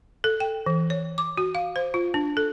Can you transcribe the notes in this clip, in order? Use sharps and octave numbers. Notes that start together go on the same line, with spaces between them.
A4
G5
E3
C#5
D6
F#4
F5
C5
F4
D4
A4